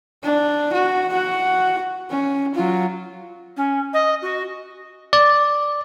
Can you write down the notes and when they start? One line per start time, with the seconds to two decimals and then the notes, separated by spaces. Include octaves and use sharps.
0.23 D4
0.73 F#4
1.11 F#4 F#5
2.10 C#4
2.55 F#3 F4
3.57 C#4
3.94 D#5
4.22 F#4
5.13 D5